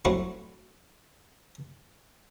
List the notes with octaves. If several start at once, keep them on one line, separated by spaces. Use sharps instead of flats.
F#3 G3 A3 C4 E4 F#4